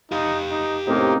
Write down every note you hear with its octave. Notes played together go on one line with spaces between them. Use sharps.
D#4 G4 F5
D#4
A2 C3 A3 A#3 C4 C#4 D#4